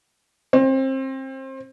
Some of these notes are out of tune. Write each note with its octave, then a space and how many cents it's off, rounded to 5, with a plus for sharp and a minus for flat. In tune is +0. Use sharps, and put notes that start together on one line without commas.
C4 +30